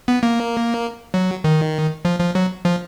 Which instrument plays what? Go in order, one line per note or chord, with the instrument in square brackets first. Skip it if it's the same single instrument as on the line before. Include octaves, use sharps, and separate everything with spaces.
[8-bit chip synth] B3
A#3
F#3
D#3
F3
F3
F#3
F3